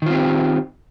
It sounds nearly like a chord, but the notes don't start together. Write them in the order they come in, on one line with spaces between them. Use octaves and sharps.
D#3 F4 C4 G4